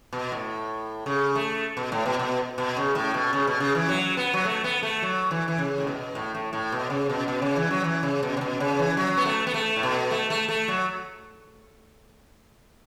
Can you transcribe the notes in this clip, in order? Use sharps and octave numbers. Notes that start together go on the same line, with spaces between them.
B2
A2
C#3
A3
B2
A2
B2
B2
B2
C#3
A2
B2
C#3
B2
C#3
E3
F#3
B3
F#3
A3
B3
A3
F#3
E3
E3
C#3
A2
B2
A2
A2
A2
B2
C#3
B2
B2
C#3
E3
F#3
E3
C#3
B2
C#3
B2
C#3
E3
F#3
B3
A3
B3
A3
A2
B2
A3
A3
A3
F#3